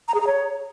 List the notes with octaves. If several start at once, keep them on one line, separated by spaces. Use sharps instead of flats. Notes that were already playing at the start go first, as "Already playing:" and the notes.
A#5
G#4
A#5
C#5